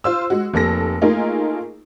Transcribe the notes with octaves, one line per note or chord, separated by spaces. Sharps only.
F4 C5 E6
G#3 F#4
F1 A#3 A4 A#6
A3 A#3 D#4 F4 G#4 A#4